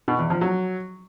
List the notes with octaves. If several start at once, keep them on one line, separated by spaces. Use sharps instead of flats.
B2
E2
F3
F#3